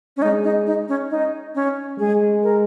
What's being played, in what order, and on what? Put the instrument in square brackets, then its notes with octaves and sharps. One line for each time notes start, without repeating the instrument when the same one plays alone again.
[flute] C#4
[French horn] G#3 [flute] D#4
[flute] D#4
D#4
C#4
D#4
C#4
[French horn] G#3 [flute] G#4
[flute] A#4